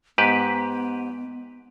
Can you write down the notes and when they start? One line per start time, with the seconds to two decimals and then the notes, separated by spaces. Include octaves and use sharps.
0.18 G#2 B3 G4 B4